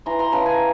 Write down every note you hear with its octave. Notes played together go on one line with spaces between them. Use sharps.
E3 A#5 C6
A#5 C6
C#3 A5 B5
G#5 A#5